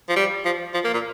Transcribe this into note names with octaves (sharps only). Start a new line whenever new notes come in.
F3
G3
F3
F3
A#3
A#2